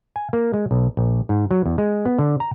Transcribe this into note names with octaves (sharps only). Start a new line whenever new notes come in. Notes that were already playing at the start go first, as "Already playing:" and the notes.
G#5
A#3
G#3
B1
A#1
G#2
F#3
E2
G#3
B3
D3
A#5